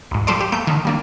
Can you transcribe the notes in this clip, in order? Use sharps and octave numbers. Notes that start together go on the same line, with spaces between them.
D2 G#2
F3 G3 A4 C5 D5
G4
A3 A#3 G6
D3 D#3
G3 A#3 D4